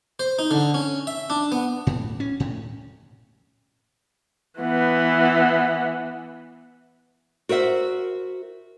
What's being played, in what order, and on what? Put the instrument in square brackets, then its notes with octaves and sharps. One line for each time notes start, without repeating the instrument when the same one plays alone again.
[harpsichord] C5
D#4
D3
C#4
E5
D4
B3
[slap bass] A2
C#4
A2
[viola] E3 B3
[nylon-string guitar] F#4 A#4 C5 E5